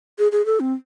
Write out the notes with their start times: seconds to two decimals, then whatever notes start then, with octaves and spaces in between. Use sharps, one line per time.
0.19 G#4
0.32 G#4
0.46 A4
0.60 C4